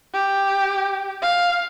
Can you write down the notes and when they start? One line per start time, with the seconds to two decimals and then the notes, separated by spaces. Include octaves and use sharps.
0.14 G4
1.22 F5